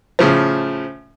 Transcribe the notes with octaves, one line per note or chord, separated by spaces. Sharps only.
A2 C#3 F3